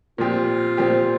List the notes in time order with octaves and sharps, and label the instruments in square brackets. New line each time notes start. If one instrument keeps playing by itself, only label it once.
[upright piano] A#2 F3 C4 G4 [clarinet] F4
[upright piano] A#2 F3 C4 G4